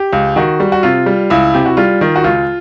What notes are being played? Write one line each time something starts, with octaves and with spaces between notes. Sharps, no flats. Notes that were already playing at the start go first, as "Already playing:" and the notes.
Already playing: G4
C#2
D#3 F#4
G3
F#4
C3 F4
G3
C#2 E4
C3 G4
F#4
G3 F4
D#3
F#4
C#2 F4